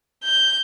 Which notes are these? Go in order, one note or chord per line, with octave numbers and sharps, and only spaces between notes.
G6